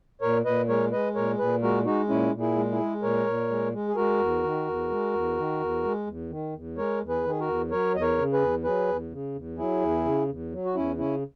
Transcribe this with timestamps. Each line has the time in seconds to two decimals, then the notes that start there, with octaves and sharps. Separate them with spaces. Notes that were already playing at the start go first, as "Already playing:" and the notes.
0.21 A#2 A#4 C#5
0.45 A#2 B4 D#5
0.68 G#3 A#4 C#5
0.92 G#3 B4 D#5
1.15 A#2 A#4 C#5
1.39 A#2 G#4 B4
1.62 G#3 F#4 A#4
1.85 G#3 D#4 F#4
2.09 A#2 C#4 E4
2.33 A#2
2.40 E4 G#4
2.56 G#3
2.71 E4 G#4
2.80 G#3
3.02 A#2 A#4 C#5
3.26 A#2
3.50 G#3
3.73 G#3
3.88 G#4
3.96 G#3 F#4 A#4
4.19 E2
4.43 D#3
4.67 E2
4.90 G#3
5.13 E2
5.37 D#3
5.60 E2
5.84 G#3
6.07 E2
6.30 D#3
6.54 E2
6.77 G#3 A#4 C#5
7.01 E2
7.09 G#4 B4
7.24 D#3 G#4
7.40 F#4 A#4
7.47 E2
7.71 F#3 A#4 C#5
7.94 E2 D#5
8.02 A#4 C#5
8.18 C#3
8.33 G#4 B4
8.41 E2
8.64 F#3 G#4 B4
8.88 E2
9.12 C#3
9.35 E2
9.58 F#3 E4 G#4
9.81 E2
10.05 C#3
10.29 E2
10.52 F#3
10.65 F#4
10.75 E2 C#4 E4
10.98 C#3 C#4 E4